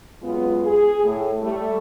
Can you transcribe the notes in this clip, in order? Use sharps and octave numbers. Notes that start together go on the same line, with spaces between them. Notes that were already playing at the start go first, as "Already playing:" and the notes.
F#2 G#3 B3 F4
G#4
A2
G3 A3